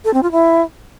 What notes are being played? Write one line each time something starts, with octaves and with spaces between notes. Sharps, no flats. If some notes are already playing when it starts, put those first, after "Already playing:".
A4
C4
F4
E4